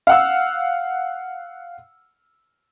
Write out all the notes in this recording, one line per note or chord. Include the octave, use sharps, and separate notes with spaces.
F5 F#5 E6